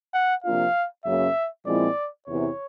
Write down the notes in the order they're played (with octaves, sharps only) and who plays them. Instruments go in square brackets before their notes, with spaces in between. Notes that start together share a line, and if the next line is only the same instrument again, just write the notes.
[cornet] F#5
[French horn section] C3 F3 A#3 D4 F4 [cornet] F5
[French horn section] F#2 C#3 F#3 A#3 [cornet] E5
[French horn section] A#2 F3 G#3 C4 E4 [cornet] D5
[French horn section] E2 C3 E3 [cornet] C#5